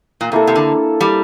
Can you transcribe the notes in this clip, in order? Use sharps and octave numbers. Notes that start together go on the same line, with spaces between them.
A#2
C3 A#3 E4 A4
C3
D3
G3